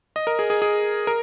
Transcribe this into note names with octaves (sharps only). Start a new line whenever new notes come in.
D#5
A#4
G#4
G#4
G#4
A#4